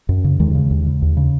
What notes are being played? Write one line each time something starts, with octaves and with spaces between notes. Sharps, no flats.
F#2
C#3
D#2 D#3 G#3
C#3
D#2
C#3
D#2
C#3